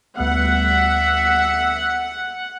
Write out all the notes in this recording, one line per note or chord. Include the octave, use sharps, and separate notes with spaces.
D2 G3 B3 E5 F#5